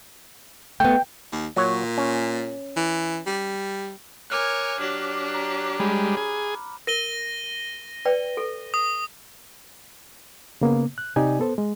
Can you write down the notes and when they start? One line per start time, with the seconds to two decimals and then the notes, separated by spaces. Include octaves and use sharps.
0.80 A3 B3 G5
1.32 D#2
1.56 A#2 F#3 C#5
1.98 C#4
2.76 E3
3.26 G3
4.30 A#4 C#5 G#5 D6 F6 F#6
4.80 F#3 D4 G4 D6
5.35 A#5
5.80 G3 G#3 B5
6.17 G#4
6.87 A#4 A#6 D#7 G7
8.05 B4 D5 G5
8.37 A4
8.74 D#6
10.61 C#3 A#3 B3
10.98 F#6
11.16 C3 D#4 G4 D5 G#5
11.40 B3 A4 C5
11.58 G#3